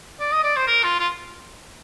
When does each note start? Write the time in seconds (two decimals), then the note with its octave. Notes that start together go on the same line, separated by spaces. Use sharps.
0.20 D5
0.32 D#5
0.43 D5
0.56 C5
0.67 A#4
0.84 F4
0.99 F4